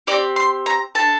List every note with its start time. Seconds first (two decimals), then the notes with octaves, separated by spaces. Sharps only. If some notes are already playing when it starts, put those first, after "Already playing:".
0.07 D#4 G4 D5
0.12 C4
0.36 C6
0.66 A#5
0.95 D4 A4 A5